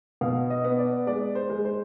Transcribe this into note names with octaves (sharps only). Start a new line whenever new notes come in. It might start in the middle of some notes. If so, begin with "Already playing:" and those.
B2 F5
D#5
B3
D5
G#3 D5
C5
G#3
C5